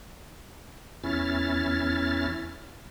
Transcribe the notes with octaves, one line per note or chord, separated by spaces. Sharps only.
E2 C#4 E4 F6 A6